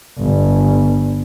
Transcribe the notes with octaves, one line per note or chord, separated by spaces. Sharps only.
G1